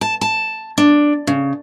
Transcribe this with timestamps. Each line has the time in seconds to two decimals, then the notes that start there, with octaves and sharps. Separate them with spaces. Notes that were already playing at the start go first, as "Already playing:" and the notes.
0.01 A5
0.21 A5
0.78 D4
1.27 C#3